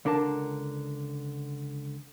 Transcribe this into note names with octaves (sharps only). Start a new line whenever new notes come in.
C#2 D3 D4 A#4 A5